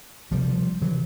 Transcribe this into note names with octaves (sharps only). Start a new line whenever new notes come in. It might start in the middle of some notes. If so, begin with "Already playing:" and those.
D2 C3 F3 G3
C3 E3 F#3